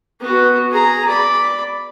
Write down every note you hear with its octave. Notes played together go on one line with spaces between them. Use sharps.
B3 F#4
G#4 A#5
D5 B5